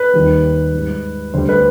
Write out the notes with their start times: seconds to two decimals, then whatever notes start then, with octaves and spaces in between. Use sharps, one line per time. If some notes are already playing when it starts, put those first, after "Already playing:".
Already playing: B4
0.14 D#2 D#3 G3
0.73 G#2 G3
1.34 D2 D3 G3 C5
1.49 B4